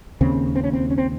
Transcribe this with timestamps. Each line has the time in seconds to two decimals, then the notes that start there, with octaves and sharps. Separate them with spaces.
0.21 D#2 C#3 C4
0.55 C4
0.64 C#4
0.73 C4
0.91 C#4
0.98 C4